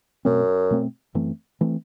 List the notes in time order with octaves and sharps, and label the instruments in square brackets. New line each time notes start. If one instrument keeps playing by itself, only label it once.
[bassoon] F#2 [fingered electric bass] B2 A3 C4
[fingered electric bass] B2 A3 C4
F#2 E3 A3 C4
E3 A3 C4